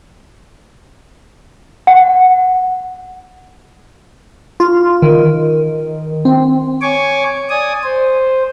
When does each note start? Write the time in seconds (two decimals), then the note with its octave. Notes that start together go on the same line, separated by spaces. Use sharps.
1.87 F#5
4.60 F4
5.02 D#3
6.25 C4
6.82 C#5 G#5 C#6 D6
7.49 D5 G#5 D#6
7.83 C5